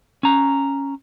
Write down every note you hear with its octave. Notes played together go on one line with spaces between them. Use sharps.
C#4 A#5